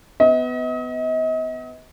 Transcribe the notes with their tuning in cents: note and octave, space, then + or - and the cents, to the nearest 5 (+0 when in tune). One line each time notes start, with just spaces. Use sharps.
B3 +20 D#5 +40